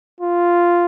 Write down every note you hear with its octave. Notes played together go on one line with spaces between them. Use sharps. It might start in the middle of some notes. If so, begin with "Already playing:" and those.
F4